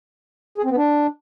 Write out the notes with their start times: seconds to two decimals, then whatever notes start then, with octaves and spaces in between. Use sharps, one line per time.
0.58 G#4
0.64 C4
0.71 B3
0.77 D4